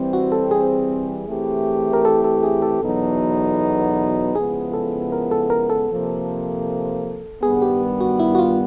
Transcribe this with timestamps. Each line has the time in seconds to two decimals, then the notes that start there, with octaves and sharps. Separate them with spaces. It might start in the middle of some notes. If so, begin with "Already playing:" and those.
Already playing: E3 G3 C4
0.13 F#4
0.32 A4
0.51 G#4
1.28 E3 A3 C4 E4 G4
1.93 A#4
2.05 A4
2.24 A4
2.43 G#4
2.62 A4
2.82 E2 B2 F#3 B3 D#4
4.35 C#3 F3 G#3 B3 E4 G#4
4.73 A4
5.12 A#4
5.31 A4
5.50 A#4
5.70 A4
5.89 C3 F3 A#3
7.42 G2 D#3 G3 B3 G#4
7.62 G4
8.00 F#4
8.19 E4
8.35 F#4
8.39 F4